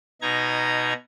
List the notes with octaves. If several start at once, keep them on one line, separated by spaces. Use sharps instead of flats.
B2 D#4 A#5 G#6